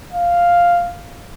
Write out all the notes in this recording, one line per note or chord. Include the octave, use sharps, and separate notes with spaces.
F5